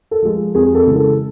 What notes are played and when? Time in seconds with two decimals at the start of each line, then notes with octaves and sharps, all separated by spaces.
0.11 A4
0.22 F3 G#3
0.55 F2 G#4
0.75 A4
0.86 C#3 E3 G#3
0.96 A4